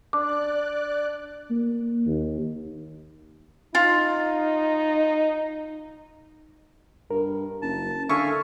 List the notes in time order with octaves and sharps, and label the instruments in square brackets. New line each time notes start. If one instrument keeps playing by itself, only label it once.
[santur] D4 [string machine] D5 F#6 [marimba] D6
[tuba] A#3
D#2
[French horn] D#4 [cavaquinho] F4
[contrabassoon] G2 [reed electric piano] A#4
[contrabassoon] F#1 [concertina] A5
[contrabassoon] D3 [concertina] E5 F5 G#5 [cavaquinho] C#6